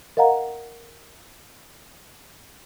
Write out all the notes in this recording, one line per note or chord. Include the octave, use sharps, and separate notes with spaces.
A#4 D#5 F5 F#5 A#5